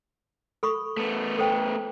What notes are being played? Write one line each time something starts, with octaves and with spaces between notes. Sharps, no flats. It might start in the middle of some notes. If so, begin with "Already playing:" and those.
A4 B5 C#6
A3 B3
A4 C5 G5